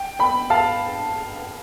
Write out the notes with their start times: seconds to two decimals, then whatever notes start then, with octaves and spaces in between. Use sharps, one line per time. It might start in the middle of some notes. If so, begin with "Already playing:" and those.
Already playing: G5
0.19 G5 B5
0.50 F5 A5